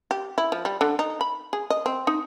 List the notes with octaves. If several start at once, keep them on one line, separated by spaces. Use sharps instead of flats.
G4
E4
F3
G3
D3
D#4
B5
G#4
D#5
C4
D#4